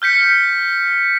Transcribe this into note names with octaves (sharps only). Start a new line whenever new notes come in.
F6 G6 B6 C#7